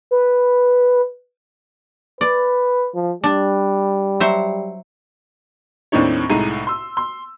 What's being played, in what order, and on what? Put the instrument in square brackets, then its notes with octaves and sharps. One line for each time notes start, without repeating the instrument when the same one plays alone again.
[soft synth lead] B4
[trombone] B4 [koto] D5
[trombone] F3
[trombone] G3 [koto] D4
[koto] F#3 C5 E5
[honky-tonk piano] D#2 A2 C4 D4 D#4 C#5
C2 A2 G#3 D#4 A#5 D#7
C6 E6
C6